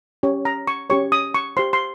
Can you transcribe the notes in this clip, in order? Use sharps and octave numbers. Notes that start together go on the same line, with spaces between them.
C#4 G4 C#5
A#5
C#6
C#4 G4 C#5 C#6
D#6
C#6
G4 C5 C6
C6